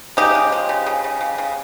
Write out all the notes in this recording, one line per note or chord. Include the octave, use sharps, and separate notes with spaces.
C#3 D#4 G4
G#3
F3
C#3
C#3
C#3
C#3
C#3